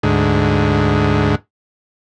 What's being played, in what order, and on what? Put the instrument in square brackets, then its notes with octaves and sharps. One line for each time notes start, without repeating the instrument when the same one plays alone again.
[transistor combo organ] D2 G#2